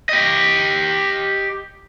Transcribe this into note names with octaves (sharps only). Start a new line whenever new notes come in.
G4 D#5